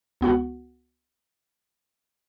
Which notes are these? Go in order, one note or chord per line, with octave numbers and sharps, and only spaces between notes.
C#2 B3 F#4 F#5